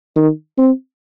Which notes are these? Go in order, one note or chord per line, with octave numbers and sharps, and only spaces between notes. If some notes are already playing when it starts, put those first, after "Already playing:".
D#3
C4